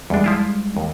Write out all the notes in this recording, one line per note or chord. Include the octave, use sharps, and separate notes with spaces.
E2 G3 G#3 D4
F3 E4 F4
D#2